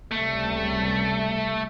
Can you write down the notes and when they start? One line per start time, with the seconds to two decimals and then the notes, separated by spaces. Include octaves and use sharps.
0.11 C#2 C3 G3 A3